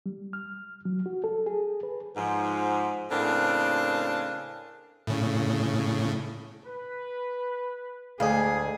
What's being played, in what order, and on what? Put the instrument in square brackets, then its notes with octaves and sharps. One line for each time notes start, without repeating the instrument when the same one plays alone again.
[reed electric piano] G3
F6
F#3
F#4
A4
G#4
B4
[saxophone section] G#2 F3
A2 C#3 A#3 C4 D4
[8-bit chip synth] A2 C#3
[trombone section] B4
[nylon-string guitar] D2 [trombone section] D3 G#3 [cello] G#4 [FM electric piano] D#5 F5